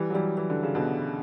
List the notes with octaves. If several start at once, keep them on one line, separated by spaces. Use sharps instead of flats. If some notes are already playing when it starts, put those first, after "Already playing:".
Already playing: E3 G3
F#3
E3 G3
E3
D3
C#3
B2 D3